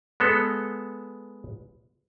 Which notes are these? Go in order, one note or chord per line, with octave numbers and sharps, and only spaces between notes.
G#3 B3 A4